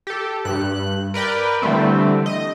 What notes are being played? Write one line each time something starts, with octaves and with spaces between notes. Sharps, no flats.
G4 A4
G2 F#6
A#4 B4 D5 G5
D3 E3 G3 A3 C4
D#5